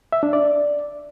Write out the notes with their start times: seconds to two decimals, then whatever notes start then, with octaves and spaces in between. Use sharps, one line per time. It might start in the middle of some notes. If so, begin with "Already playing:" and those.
0.12 E5
0.23 D4
0.33 D5